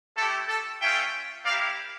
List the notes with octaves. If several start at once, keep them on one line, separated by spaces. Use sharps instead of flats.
A3 E4 G4 A4
A4
A3 C#4 F4 E5 G5
A#3 E4 G4 D5 F5